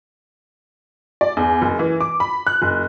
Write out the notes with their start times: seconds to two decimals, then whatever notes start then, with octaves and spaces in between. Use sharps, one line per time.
1.21 D5
1.37 E2
1.62 F#1
1.79 E3
2.01 D6
2.20 B5
2.47 F#6
2.62 F#1